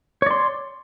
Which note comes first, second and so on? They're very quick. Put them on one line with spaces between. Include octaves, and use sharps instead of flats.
C#5 D5 C6